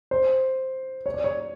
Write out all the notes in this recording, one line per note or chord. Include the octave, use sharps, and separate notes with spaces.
C5
C#5
D5
C#5